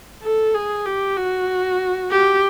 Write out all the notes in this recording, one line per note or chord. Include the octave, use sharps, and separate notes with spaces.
A4
G#4
G4
F#4
G4